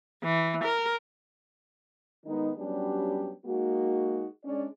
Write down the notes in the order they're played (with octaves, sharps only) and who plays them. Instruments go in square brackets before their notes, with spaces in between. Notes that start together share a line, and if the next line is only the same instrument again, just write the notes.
[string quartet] E3
A#4
[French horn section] D#3 G#3 B3 D#4
F#3 G3 B3 C#4 D4 G4
G#3 A#3 D#4 F#4
G#3 C#4 D4 D5